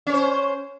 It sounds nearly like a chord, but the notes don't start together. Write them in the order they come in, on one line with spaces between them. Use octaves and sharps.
C#4 C#5 C5